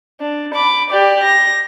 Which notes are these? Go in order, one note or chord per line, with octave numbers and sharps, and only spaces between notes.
D4
B5 D6
G4 D5
A#6